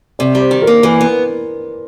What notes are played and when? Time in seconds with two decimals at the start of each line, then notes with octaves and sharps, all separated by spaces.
0.19 C3 D5
0.35 G3
0.41 C5
0.51 D#3
0.62 A#4
0.67 A#3
0.83 E3 A#4
1.01 B3